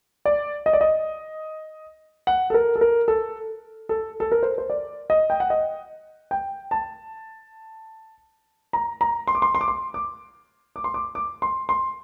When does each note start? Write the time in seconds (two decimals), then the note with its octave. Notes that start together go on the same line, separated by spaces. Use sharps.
0.26 D5
0.66 D#5
0.73 D5
0.81 D#5
2.27 F#5
2.50 A4
2.54 A#4
2.76 A4
2.81 A#4
3.08 A4
3.89 A4
4.20 A4
4.32 A#4
4.43 C5
4.58 C5
4.70 D5
5.10 D#5
5.30 G5
5.40 F#5
5.50 D#5
6.31 G5
6.71 A5
8.73 A#5
9.01 A#5
9.27 C6
9.35 D6
9.42 C6
9.55 C6
9.61 D6
9.68 C6
9.94 D6
10.76 D6
10.84 C6
10.94 D6
11.15 D6
11.42 C6
11.69 C6